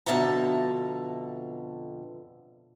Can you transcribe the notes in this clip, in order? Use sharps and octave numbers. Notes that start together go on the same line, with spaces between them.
F2 B2 D3 E5 A5 A#5